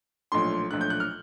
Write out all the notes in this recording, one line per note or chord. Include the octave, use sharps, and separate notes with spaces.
B1 A#2 F3 A3 D4 C6
B1 A#2 F3 A3 D4 F#6
G6
F#6
F6